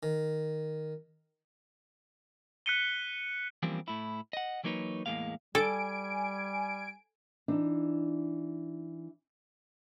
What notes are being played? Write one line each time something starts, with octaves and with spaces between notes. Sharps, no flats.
D#3
F#6 B6 C#7 D#7 G7
E3 F3 G3 A#3 C4 C#4
A2 E4
D#5 F#5
E3 F#3 A#3 D#4 B4 C#5
E2 A2 G#3 A#3 F5
G3 A4 G#5 D7
E3 D4 D#4